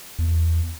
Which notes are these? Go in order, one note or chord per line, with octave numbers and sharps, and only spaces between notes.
E2